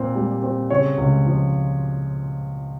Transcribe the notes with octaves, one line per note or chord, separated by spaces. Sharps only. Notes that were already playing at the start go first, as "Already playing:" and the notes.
Already playing: A#2 C4
G3
C4
C#3 C#5
C#2
F3